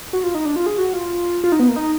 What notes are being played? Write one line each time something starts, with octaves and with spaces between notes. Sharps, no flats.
F#4
F4
D#4
D4
F4
G#4
F#4
F4
F4
D#4
B3
A#3
D#4